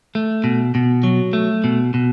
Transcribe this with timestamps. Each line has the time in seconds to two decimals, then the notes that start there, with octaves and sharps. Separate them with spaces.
0.15 A3
0.44 B2
0.75 B2
1.04 F#3
1.33 A3
1.64 B2
1.94 B2